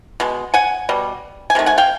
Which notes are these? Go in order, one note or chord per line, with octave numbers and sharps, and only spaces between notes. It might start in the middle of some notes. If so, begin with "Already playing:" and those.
B2 G#3
F#5 G#5
B2 G3
G#5
C3 D#3 A3
F#5 G#5
F5 G5